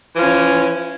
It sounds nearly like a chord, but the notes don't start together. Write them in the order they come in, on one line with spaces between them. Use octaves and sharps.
E3 F3 C#4